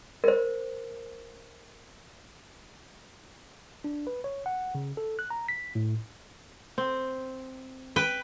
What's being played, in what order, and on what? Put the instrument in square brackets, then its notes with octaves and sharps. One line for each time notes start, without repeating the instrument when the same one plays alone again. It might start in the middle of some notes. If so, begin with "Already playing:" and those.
[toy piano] A#4 C5
[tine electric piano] D4
B4
C#5
F#5
C#3
A4
F#6
A#5
B6
A2
[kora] C4
[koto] B4 G5